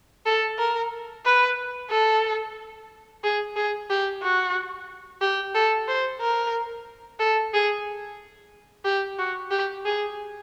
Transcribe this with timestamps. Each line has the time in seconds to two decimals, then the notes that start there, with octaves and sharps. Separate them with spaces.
0.26 A4
0.58 A#4
1.25 B4
1.90 A4
3.24 G#4
3.56 G#4
3.90 G4
4.23 F#4
5.22 G4
5.55 A4
5.88 C5
6.21 A#4
7.19 A4
7.54 G#4
8.85 G4
9.19 F#4
9.51 G4
9.85 G#4